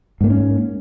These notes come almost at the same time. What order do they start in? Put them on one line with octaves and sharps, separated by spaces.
G#2 A#3 B3 C#4